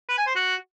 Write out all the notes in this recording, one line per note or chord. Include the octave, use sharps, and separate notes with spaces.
B4
G#5
C5
F#4